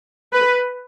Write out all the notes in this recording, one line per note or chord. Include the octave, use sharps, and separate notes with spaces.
B4